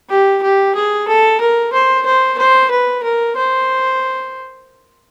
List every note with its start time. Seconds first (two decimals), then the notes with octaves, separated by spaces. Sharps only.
0.10 G4
0.43 G4
0.75 G#4
1.08 A4
1.41 A#4
1.73 C5
2.06 C5
2.38 C5
2.71 B4
3.03 A#4
3.36 C5